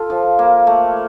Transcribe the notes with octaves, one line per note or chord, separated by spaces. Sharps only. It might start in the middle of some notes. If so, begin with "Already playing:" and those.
Already playing: F4 A4
F3
A#3
A3